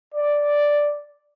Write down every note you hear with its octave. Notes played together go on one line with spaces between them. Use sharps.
D5